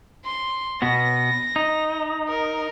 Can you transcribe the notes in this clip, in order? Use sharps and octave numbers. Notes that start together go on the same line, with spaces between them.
C6
B2 B3 A#6
D#4
A#4